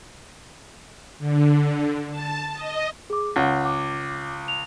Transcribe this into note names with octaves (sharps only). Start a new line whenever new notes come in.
D3
A5
D#5
G#4 D6
C#2 F#5
D6
F7